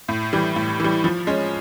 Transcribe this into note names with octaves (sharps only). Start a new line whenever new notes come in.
A2
E3 G3
A2
E3 G3
F3
G#3 C#4